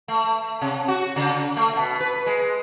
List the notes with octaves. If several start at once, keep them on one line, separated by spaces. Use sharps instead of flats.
A3
C3
F#4
C#3
A3
B2
B4
G#3